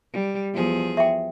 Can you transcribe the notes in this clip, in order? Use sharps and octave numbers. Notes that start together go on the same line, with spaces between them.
G3
E2 F3 G#4
E5 G5